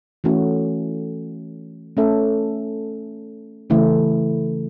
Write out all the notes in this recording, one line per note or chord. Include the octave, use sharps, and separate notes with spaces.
E3 A3 C#4 F#4 A4
A3 C#4 A4 E5
C#3 E3 A3 E4